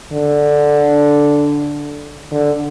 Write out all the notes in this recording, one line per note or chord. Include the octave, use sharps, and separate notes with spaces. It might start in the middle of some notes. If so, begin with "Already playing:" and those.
D3
D3